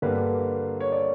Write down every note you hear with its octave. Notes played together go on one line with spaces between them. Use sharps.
G2 D3 G3 A#3 B4
C#5
D5